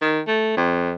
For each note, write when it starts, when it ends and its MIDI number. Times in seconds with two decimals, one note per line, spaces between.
0.01 0.20 51
0.27 0.55 57
0.57 0.95 41